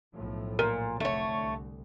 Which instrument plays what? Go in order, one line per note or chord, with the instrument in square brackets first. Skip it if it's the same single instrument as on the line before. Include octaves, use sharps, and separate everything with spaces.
[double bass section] B1 A2 F3
[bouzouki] A#2 [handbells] A#4
[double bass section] F1 A2 D3 [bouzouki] A3 C#5
[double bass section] C2